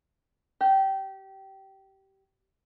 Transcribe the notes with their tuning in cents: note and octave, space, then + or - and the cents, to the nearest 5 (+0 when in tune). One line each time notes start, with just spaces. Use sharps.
G4 -20